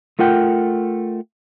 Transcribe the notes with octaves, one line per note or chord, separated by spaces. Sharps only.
A3 F4 A#4 F#5 G5